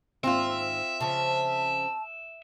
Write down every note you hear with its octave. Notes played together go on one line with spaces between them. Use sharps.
D#2 G#2 C4 F4 E5
C#3 F3 A5